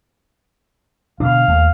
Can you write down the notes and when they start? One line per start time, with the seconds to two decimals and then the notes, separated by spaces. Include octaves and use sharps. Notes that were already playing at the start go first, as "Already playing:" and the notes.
1.20 B2 D3 D4 F5
1.48 D#2 G#3 A3